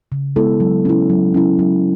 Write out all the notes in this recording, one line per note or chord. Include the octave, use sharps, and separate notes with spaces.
C#3
G#3 B3 E4 A4
F#3
C#4 E4
F#3
C#4 E4
F#3